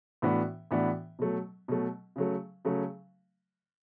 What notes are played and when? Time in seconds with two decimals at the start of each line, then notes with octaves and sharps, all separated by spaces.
0.22 A2 E3 B3 D4 F#4
0.71 A2 E3 B3 D4 F#4
1.19 B2 F#3 A3
1.68 B2 F#3 A3
2.16 C#3 F#3 A3
2.65 C#3 F#3 A3